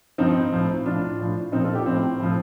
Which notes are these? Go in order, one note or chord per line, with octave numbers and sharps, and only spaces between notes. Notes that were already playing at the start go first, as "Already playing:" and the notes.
G2 F3 C4 D#4
A2 F3
A2 F3 D4 F4
A2 F3
A#2 F3 C4 D#4
F4 A4
D#4 G4
A2 F3 C4
A2 F3